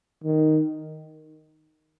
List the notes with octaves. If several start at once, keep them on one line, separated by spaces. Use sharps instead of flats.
D#3